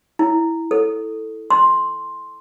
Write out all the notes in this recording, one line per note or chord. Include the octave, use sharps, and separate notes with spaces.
E4
A4
C6